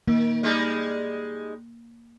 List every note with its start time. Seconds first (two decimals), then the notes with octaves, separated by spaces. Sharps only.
0.08 D#3 A#3
0.43 G3 G#3 D#4